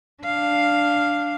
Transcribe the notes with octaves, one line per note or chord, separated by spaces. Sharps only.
D4 F5